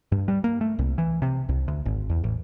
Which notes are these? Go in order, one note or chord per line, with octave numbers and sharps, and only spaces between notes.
G2
G3
A#3
A3
C2
E3
C3
C2
D2
G#1
E2
A1